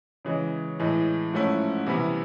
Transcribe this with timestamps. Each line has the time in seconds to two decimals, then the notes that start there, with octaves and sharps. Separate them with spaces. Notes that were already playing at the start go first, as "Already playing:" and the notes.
0.25 C#3 E3 G#3
0.79 A2 E3 G#3
1.33 G#2 F3 A3 C#4 E4
1.86 C3 E3 G3 B3 E4